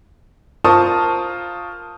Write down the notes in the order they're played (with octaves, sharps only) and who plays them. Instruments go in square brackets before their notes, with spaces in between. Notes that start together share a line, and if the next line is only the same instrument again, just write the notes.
[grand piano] F4 A#4 C5 A5 C#6 D#6